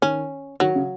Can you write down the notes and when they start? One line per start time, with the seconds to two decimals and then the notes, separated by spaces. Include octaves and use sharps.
0.02 D#3 C#4
0.60 D#3 F#3
0.75 C#3